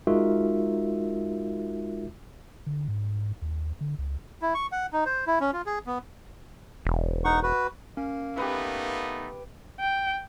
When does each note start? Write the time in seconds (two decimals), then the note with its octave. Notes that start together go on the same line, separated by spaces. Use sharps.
0.07 G#3 D#4 F4 F#4 A#4 E5
2.66 D3
2.88 G#2
3.42 D#2
3.81 D3
3.99 C#2
4.42 E4
4.54 C#6
4.72 F#5
4.93 D#4
5.06 C5
5.27 E4
5.40 C#4
5.53 F4
5.66 G#4
5.87 B3
6.85 E1
7.25 D#4 F#5 C#6
7.43 F#4 B4
7.97 A#3 C#4
8.37 A3 B3 D#4 G4 B4
9.80 G5